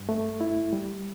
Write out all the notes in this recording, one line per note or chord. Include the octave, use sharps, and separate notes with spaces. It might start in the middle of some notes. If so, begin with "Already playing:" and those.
Already playing: G2
A3
E4
G3